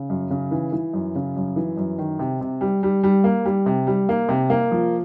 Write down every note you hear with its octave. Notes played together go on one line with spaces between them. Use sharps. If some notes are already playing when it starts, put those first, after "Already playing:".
Already playing: C#3
F#2
C#3
E3
E3
F#2
C#3
F#2
E3
F#2
D#3
C3
C3
G3
G3
G3
A#3
G3
C3
G3
A#3
C3
A#3
F3